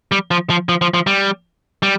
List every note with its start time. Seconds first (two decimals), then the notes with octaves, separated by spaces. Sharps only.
0.12 G3
0.31 F3
0.50 F3
0.69 F3
0.81 F3
0.94 F3
1.07 G3
1.83 G3